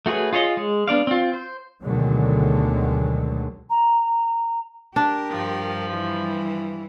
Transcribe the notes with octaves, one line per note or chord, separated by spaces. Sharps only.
A3 F#4 G#4 B4 C#5
F4 G#4 C#5 D#5
G#3
B3 D4 D5 F5
C4 F4
C5
D2 B2 D3 D#3 F#3 G#3
A#5
D4 G4 A#4
G2 F3
E3 G3